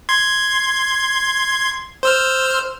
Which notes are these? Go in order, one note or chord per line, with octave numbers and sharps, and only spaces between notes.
C6 G#6
C5 E6 F6